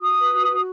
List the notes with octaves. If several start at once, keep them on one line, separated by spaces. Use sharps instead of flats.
F#4 D#6
B4
F#4
F#4